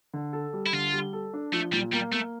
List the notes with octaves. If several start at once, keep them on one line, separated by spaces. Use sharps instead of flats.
D3
A4
G3
E4
D3 F4
G3
A4
D4
F3 A3
A#2 G3
G3 A#3
A3 A#3